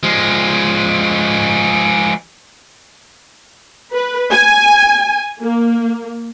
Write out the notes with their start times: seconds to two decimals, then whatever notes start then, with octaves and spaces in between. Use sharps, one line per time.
0.03 F3 G#3
3.95 B4
4.31 G#5
5.41 A#3